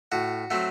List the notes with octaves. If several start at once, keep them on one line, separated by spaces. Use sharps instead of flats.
A2 F#4
F#3 A3 C4